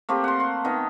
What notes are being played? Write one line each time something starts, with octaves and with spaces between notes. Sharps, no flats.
A3 A#3 C4 G4
F#5 C6
C6
D#3 B3 D#5